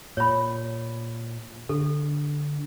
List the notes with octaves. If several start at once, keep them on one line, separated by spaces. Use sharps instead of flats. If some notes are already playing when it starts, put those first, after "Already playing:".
A#2 C#5 B5
D3 A4